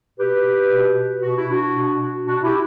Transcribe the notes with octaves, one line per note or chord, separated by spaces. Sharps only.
B2 G4 B4
B2
B2 F#4
E4
D4 F#4
B2
B2 D4 F#4
E4 G4